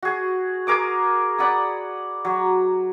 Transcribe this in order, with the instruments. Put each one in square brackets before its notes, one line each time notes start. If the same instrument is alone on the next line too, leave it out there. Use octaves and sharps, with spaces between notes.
[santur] F#4 G#4
G#4 A#4 D6 D#6
D5 F#5 B5 D#6
F#3